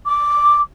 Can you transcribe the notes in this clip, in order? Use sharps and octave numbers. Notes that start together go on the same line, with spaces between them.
D6